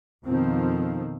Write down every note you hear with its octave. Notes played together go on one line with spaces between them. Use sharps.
F2 B2 D#3 F3 C4